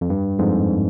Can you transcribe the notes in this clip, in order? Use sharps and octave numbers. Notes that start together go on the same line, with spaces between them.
F2
G2
F2 G#2